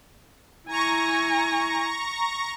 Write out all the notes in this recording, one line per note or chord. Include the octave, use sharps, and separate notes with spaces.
E4 G#5 A#5 C#6 A#6